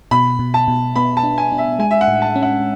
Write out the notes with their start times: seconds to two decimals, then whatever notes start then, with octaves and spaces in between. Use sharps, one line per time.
0.11 B2 B5
0.39 B2
0.54 A5
0.68 B2
0.96 B3 B5
1.17 A5
1.23 D4
1.38 G#5
1.52 D4
1.58 E5
1.79 G#3 G#5
1.91 E5
2.01 F#5
2.08 A2
2.22 A5
2.36 C#4
2.42 F#5